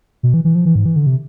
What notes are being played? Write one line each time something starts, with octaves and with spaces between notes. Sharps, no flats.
B2
E3
E3
F3
E3
G#2
E3
D3
C3